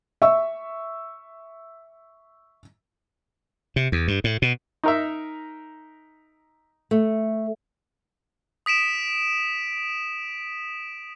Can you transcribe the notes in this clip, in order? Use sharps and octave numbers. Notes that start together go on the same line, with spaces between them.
E5 C#6 E6
C3
E2
G2
A2
B2
D#4 A#4 E5
A3
D#6 B6 D7 E7